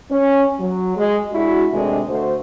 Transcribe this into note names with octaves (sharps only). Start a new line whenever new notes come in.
C#4
F#3
G#3
G#3 D4 E4 F#4
C3 D#3 G#3 A3 D4
D3 A3 F#4 C5